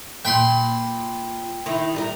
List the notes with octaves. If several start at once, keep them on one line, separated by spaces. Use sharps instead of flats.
A#2 G5 B5 C6
D#3 E4
G3 D#4 A#4